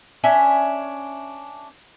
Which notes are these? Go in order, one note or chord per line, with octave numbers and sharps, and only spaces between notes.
C#4 D4 E5